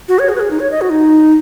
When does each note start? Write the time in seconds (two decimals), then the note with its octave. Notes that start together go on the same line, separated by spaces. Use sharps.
0.08 F#4
0.19 C#5
0.29 G#4
0.35 B4
0.40 G#4
0.50 D#4
0.60 C#5
0.71 D#5
0.81 F#4
0.91 D#4